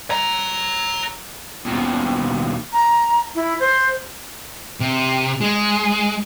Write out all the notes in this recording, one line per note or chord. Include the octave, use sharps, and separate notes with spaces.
C#5 A#5
D#2 B2
A#5
E4
C5
C3
G#3